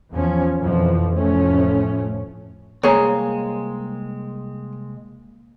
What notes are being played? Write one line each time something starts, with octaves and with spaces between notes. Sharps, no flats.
E2 F3 C#4
F2 B2 E3 F3
F1 A2 F3 A3 C#4
C2 G#3 A#3 C4 G#4 C#5 A#5